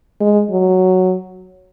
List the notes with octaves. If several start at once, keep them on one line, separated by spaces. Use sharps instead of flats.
G#3
F#3